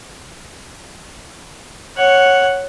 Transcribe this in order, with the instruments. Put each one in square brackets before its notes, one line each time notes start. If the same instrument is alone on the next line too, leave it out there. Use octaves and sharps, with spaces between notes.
[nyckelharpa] C#5 F#5